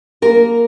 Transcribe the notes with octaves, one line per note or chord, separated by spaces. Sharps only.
A#3 A#4